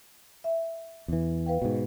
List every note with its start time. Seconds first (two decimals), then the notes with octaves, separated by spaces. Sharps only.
0.44 E5
1.08 E2 E3
1.46 B4 F5 G5
1.62 G#2 B2